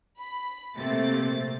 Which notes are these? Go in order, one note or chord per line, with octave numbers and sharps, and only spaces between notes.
B5
A#1 C3 A3 A#3 A6